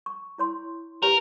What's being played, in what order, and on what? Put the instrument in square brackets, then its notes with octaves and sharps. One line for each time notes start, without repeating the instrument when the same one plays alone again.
[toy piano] C#6
E4 C#5 C6
[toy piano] G4 B4 C#5 [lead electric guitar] A#4